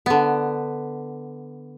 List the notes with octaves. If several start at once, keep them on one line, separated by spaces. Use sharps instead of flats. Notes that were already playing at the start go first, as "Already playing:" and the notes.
D3 B3